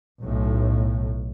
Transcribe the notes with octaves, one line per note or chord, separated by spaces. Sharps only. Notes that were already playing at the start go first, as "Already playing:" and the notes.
B1 A2